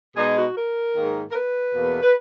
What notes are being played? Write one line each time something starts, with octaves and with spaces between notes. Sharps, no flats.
B2 G#3 D#4 G#4
F#4
A#4
G#2 D#3 A#3
A#4
B4
E2 B2 A#3
B4